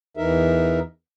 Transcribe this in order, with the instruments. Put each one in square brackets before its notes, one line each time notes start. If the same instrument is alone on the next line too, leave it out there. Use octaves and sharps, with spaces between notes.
[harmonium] E2 E3 D#4 A#4 E5